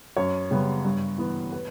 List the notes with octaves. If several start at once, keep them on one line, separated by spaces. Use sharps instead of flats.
F#2 C#5
C#3 G3 B3
G2
E3 B3
B4